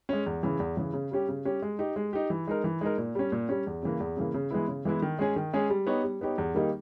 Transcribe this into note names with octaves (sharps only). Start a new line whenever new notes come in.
G#3 C#4
E2
C#3 E3
E2
C#3 E3
C#3
G3 C#4 G4
C#3
G3 C#4 G4
G#3
D#4 G4
G#3
D#4 G4
E3
G#3 D#4 A#4
E3
G#3 D#4 A#4
A#2
G3 C#4
A#2
G3 C#4
E2
C#3 E3 A#3
E2
C#3 E3 A#3
C#3
E3 G#3 B3 E4
C#3
E3 G#3 B3 E4
D#3
G#3 C#4 G#4
D#3
G#3 C#4 G#4
G3
B3 D#4 G4 C#5
G3
B3 D#4 G4 C#5
E2
D#3 G3 A#3 D#4